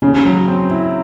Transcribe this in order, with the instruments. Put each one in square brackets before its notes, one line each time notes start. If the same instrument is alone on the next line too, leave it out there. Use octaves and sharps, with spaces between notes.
[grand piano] C#3 [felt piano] C#4
[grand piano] F#3
C4
E4